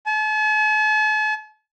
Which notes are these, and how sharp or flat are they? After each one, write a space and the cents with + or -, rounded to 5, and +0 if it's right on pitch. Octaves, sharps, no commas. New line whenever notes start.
A5 -45